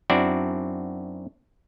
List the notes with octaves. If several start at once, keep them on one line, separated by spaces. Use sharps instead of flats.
F#2 C4 D4 E4 F#4 D5